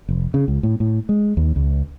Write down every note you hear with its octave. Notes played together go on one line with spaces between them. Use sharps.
F1
C#3
C#2
A2
A2
G#3
D#2
C#2